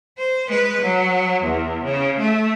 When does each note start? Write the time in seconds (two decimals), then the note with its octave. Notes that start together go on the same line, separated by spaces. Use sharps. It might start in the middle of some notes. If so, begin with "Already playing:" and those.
0.19 C5
0.49 G#3 B4
0.82 F#3
1.44 E2
1.84 C#3
2.18 A3